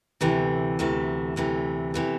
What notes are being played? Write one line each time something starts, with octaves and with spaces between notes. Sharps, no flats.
D2 C3 E3 A3
D2 C3 E3 A3
D2 C3 E3 A3
C3 E3 A3